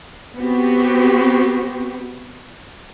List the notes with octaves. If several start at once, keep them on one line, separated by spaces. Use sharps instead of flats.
B3 C4 F#4 G4